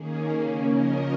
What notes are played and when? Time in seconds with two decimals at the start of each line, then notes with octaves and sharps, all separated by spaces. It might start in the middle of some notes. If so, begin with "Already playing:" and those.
Already playing: D#3 A#3 C#4 G#4
0.29 C#3 A#3 C#4
0.67 C#3 F3 C#4 A#4 D#5